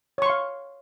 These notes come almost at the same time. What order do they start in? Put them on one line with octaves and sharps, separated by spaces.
C#5 C#6 C6 F5